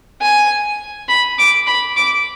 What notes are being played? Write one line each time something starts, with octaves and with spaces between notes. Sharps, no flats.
G#5
B5
D6
B5
D6